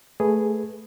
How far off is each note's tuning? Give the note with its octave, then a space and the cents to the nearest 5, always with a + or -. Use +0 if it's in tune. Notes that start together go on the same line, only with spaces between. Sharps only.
A3 -5 G#4 +0 B4 +0